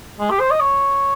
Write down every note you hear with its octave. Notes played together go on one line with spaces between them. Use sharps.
G#3
G4
C5
D#5
C#5